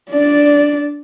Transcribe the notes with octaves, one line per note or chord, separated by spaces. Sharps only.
D4 D5